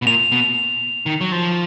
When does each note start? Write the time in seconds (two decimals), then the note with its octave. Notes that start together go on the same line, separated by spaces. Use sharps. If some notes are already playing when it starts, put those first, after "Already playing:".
0.02 B2
0.07 A#2 F7
0.32 B2
1.06 D#3
1.21 F#3
1.32 F3